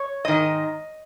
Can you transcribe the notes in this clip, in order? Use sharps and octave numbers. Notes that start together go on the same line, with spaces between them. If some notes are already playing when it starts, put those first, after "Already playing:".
Already playing: C#5
G#2 D#3 D#5